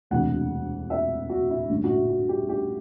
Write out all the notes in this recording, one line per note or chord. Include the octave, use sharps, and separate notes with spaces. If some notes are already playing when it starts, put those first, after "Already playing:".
E1 D2 C3 E3 F#5
E5
F#4
E4
A1 G2 D3
F#4
E4
F#4
G4
G4